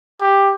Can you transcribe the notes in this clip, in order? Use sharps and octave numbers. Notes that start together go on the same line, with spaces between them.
G4